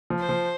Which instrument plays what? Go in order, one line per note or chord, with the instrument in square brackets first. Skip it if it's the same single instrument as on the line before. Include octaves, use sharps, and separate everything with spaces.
[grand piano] F3
[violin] C5
[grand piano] F3